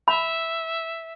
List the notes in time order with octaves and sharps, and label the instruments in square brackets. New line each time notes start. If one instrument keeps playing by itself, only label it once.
[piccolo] E5 [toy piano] B5